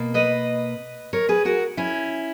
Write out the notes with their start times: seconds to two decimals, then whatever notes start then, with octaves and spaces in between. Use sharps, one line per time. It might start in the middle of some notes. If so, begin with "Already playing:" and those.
Already playing: B2 A#3
0.14 B4 D#5
1.13 A#4 C#5
1.29 G#4 B4
1.45 F#4 A#4
1.77 C#4 E4